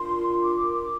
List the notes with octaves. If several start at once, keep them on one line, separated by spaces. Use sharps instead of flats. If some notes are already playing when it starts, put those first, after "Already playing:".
Already playing: D4 F4 A#4 C6
D6